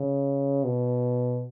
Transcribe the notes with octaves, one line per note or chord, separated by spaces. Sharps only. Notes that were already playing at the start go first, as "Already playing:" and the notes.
Already playing: C#3
B2